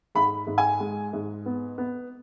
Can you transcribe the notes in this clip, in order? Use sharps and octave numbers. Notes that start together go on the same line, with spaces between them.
G#2 B5
G#2
G#5
G#3
G#2
B3
B3